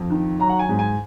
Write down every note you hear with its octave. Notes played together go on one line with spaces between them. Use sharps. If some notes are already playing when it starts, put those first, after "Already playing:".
Already playing: F2
D#3
F#3 A#5
F#5
G#5
G#2
G#5